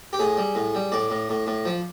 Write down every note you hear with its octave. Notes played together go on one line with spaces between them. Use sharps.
G4
A2 G#4
G3
A2
G3
A2 D5
A2
A2
A2
F3